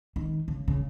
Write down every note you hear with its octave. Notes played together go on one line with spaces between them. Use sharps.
D#3
C#3
C#3